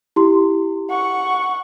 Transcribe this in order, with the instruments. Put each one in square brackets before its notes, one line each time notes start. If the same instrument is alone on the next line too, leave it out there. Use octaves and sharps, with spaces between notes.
[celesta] E4 G4 C6
[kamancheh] F#5 C#6